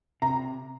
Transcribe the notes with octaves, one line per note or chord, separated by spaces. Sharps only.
C3 A#5